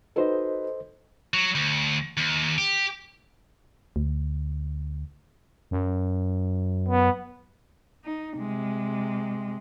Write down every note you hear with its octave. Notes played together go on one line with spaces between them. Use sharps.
D#4 F#4 A4 B4 C5 D#5
F#3
D2
D#2
G4
D2
F#2
B3
D#4
C3 G#3